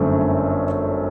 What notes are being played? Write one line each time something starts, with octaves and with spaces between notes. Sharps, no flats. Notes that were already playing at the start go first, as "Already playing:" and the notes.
Already playing: G1 F#2 D3 A3 C4